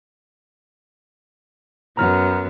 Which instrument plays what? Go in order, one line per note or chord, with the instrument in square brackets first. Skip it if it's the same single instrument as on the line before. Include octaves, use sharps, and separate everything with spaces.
[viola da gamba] F#2 B3 [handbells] A#5 F6